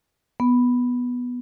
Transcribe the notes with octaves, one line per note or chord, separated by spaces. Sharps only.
B3